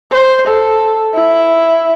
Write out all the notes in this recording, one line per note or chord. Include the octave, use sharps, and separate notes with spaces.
C5
A4
E4